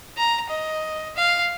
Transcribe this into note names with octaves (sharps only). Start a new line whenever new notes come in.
A#5
D#5
F5